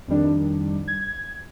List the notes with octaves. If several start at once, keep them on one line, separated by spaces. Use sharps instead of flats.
F2 D#3 G3 D4
G#6